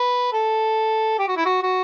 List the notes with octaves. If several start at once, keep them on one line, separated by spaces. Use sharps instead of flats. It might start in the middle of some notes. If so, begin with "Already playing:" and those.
Already playing: B4
A4
G4
F#4
E4
F#4
F#4